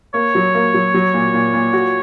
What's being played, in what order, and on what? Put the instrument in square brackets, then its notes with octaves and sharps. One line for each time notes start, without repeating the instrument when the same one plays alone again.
[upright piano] A#3 [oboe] C#5
[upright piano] F#3
A#3
F#3
F#3
A#2
A#2
A#2
F#4